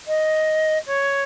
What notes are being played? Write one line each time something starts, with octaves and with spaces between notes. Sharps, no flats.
D#5
C#5